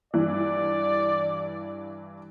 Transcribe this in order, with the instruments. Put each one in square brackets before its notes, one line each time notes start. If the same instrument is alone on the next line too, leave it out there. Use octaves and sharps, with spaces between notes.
[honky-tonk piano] G2 E3 [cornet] D5